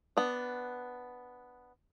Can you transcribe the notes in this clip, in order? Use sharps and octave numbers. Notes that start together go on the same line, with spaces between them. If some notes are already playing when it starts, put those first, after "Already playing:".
B3 D4